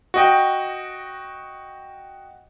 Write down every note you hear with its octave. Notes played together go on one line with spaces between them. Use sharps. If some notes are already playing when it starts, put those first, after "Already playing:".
F#4 D#5 G5